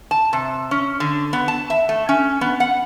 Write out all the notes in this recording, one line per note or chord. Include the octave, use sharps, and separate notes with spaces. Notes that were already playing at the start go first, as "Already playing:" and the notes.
A5
C3
C#4
D3
B3
A5
E5
A3
C#4
B3
F#5